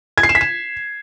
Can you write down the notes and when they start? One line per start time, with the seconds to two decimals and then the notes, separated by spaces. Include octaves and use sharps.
0.18 G#6
0.23 C7
0.29 E7
0.35 B6
0.41 E7